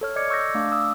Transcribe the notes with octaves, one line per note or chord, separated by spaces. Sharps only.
A4 C#5 F6
A4 D5 D#5 D6 G#6 C#7
C#6 E6 G6 G#6 A#6
A3 D4 D5 F5 D6
D#6 E6